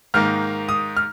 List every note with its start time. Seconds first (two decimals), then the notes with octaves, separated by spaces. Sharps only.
0.14 G#2 D#3 A#3 F6
0.69 D#6
0.97 F6